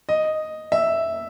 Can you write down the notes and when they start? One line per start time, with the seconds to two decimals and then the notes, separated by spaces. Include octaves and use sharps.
0.09 D#5
0.72 E5